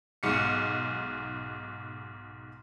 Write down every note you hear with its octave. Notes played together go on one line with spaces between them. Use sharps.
B1 G#2 C#7